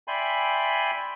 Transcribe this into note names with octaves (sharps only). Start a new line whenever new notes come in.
D5 E5 G5 G#5 B5 C6